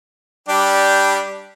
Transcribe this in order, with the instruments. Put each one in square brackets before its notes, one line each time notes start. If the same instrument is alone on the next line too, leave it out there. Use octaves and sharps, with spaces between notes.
[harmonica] G3 D4 G4